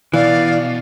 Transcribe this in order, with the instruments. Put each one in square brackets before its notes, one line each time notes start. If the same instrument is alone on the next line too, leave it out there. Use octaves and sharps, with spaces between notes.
[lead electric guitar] B2 [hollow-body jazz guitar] E3 [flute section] D5 [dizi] F5